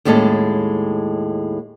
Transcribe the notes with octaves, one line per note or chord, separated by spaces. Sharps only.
D#2 A2 G#3 C#4 A4 A5